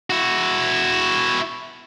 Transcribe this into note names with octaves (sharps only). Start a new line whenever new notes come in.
E4 F#4